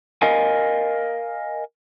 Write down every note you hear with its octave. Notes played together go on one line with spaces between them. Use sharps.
A#4 D#5 F5 G#5